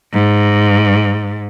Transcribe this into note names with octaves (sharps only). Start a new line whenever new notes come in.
G#2